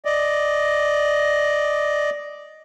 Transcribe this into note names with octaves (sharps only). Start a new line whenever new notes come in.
D5 D#5